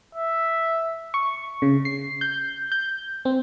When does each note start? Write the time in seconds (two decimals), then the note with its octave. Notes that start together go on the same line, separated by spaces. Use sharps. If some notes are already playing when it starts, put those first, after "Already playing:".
0.15 E5
1.14 C#6
1.62 C#3
1.85 C7
2.21 G6
2.72 G6
3.25 C4